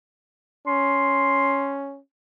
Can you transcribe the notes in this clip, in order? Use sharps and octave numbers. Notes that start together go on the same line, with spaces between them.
C#4 C6